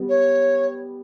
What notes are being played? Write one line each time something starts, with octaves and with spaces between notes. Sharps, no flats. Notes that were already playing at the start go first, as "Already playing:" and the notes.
Already playing: G3 B3
C#5